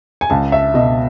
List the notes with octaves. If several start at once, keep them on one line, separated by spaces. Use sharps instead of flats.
G#5
C#2 A5
E5
B2 D#5